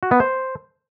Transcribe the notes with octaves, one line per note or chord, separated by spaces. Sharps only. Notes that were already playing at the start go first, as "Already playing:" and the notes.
F#4
B3
C5